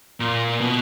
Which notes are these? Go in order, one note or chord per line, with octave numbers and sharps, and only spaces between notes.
A#2
B2